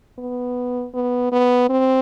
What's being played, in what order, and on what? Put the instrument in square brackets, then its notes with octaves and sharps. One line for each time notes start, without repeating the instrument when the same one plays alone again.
[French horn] B3
B3
B3
C4